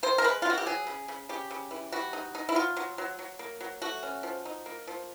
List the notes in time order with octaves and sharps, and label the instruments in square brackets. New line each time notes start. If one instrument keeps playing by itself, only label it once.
[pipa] D#3 C5
A#4
G#3 B4
F4
D#3 F#4
G4
F#3 G#4
C#3
C#3
C#3 G4
C#3
E3
G3 F#4
D#4
D#4
E4
F#3 F4
F#3
F#3
F#3
A#3
F#3
A3 F#4
C#4
F3
D#4
A#3
F3